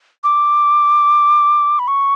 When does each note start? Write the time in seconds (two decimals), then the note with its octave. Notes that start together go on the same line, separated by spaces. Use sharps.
0.24 D6
1.79 B5
1.88 C#6